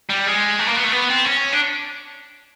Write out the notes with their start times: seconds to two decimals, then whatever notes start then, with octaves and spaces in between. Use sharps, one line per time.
0.09 G3
0.26 G#3
0.59 A3
0.67 A#3
0.76 B3
0.84 A3
0.92 B3
1.09 C4
1.26 C#4
1.53 D4